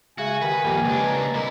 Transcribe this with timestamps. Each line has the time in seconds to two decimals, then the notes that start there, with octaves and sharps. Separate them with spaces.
0.18 C#3 G#3 F#4 E5 G#5
0.42 D#3 G4 B4
0.64 F2 A#2 A#3 G4
0.85 C#2 G#3 D4 B4 D#5
1.07 A#3 A#5
1.34 C2 E4 A#4 D#5